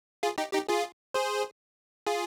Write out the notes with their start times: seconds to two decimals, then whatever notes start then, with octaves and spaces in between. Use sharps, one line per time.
0.23 F4 G#4
0.38 D#4 G4
0.53 D#4 G4
0.69 F4 G#4
1.14 G#4 C5
2.07 F4 G#4